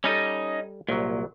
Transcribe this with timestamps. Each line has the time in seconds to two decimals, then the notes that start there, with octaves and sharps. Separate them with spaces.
0.04 G3 C#4 D#4 A4 D#5
0.89 C2 A#2 F#3